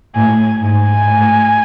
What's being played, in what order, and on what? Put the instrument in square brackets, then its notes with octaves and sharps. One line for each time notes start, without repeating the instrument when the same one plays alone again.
[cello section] A2 [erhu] G#5
[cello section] G#2 [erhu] G#5
[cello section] A2